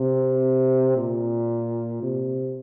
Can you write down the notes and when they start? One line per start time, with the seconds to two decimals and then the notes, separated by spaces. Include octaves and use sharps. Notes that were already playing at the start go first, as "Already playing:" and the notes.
Already playing: C3
0.97 A#2
2.02 C3